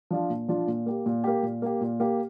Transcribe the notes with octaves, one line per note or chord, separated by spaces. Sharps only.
F3 D4 F4
A#2
F3 D4 F4
A#2
A#3 G4
A#2
A#3 G4
A#2
A#3 G4
A#2
A#3 G4